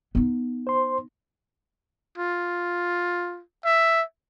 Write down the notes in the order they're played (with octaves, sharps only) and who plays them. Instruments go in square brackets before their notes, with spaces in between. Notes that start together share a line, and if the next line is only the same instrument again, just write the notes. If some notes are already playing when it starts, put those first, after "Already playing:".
[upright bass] B3 D#4
[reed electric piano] C5 C6
[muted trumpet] F4
E5